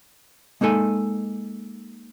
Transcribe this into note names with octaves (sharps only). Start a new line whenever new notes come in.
G#3 A#3 D#4 A4 G#5